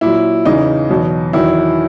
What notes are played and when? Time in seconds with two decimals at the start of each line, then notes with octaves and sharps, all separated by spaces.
0.01 A#2 F#3 E4
0.45 E2 C#3 E3 D#4
0.89 E2 B2 F#3
1.33 E2 D#3 F#3 E4